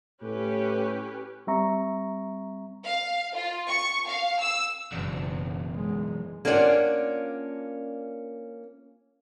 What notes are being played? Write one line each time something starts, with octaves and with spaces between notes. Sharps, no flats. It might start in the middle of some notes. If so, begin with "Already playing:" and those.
A2 C#4 G4 B4
G3 C4 E5 A#5 C#6
F5
F4
C#6
F5
E6
F#1 B1 E2
G#3
A#3 C#4 D4 F4 D5 F#5